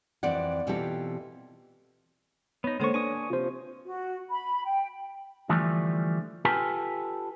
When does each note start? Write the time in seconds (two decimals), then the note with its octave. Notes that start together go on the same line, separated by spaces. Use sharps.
0.23 F2 E3 C4 D5 F#5
0.67 B2 E3 C4 F4 G4 A4
2.64 B3 D#4 C#5
2.80 D3 G#3 A#3 A4 C5 C#6
2.94 D4 B4 G#5 C#6 D#6
3.30 C3 F4 C5
3.85 F#4
4.31 B5
4.66 G5
5.49 D3 E3 F3 G3 A3
6.45 F4 G4 A4 B4 G#5